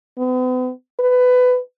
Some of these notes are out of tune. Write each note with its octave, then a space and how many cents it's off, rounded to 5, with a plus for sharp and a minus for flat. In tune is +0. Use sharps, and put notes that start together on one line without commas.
B3 +40
B4 +20